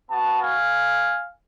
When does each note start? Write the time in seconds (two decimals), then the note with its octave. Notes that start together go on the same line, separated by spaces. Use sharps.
0.11 B3 F#4 F#5 A5
0.43 F5 G#5